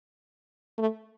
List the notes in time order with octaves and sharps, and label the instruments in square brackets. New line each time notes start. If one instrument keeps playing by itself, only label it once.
[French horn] A3